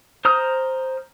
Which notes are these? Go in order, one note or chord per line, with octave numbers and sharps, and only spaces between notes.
C5 A#5 D#6 F6